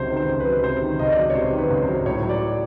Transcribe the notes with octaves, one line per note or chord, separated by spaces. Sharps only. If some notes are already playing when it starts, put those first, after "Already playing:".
Already playing: C#2 C3 D#3 F#3 C5
D#3
C5
C#2
B4
F#3
C3 C5
D#3
C#2 D#5
D5
F#3
C#5
C3 C5
D#3
B4
C#2
C5
F#3
A2 C#5
F#3
D5